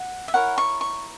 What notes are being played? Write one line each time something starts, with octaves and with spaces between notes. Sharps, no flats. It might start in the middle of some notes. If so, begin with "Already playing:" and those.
Already playing: F#5
E5
E4 A#4 C#5 F#5
C#6
C#6